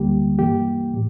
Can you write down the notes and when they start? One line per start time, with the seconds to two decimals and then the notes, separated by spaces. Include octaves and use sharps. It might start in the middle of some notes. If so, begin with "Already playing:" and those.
Already playing: D2 D3 G3 A#3 G4
0.38 G2 E3 A#3 G4
0.94 A2